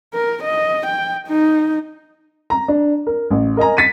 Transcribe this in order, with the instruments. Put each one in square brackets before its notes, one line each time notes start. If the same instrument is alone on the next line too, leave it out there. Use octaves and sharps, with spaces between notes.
[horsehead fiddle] A#4
D#5
G5
D#4
[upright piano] A#5
D4
A#4
A1
A#4 D#5 G#5 A#5
A6 B6 C#7 D#7